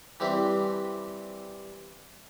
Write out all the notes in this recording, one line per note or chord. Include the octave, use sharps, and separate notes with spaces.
E3 G3 C4 E4